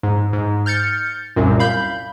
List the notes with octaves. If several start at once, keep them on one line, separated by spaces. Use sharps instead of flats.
G#2
G#2
F6 G6 A6 C#7
C2 F#2 A#2
F5 B5 G6